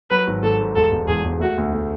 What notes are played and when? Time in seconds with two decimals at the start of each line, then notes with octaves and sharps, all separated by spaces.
0.10 F#3 B4
0.27 G#1
0.43 G#1 A4
0.60 G#2
0.75 E1 A4
0.92 E1
1.08 E2 G#4
1.24 E1
1.40 A3 F#4
1.58 D2
1.73 A3